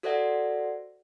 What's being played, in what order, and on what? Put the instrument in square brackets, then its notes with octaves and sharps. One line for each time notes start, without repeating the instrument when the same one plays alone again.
[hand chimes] F#4 A4 C5 D5 E5 F#5